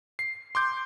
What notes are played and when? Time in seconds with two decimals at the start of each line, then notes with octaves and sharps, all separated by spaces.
0.19 C7
0.55 C6 D6 G6